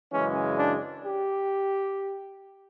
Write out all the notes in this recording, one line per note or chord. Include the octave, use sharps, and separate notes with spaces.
F#2 C#3 E3 G#3 C#4
D4
G4